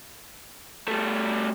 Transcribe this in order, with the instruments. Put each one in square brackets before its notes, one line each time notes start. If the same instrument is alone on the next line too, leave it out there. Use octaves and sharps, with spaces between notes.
[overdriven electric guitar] G3 A3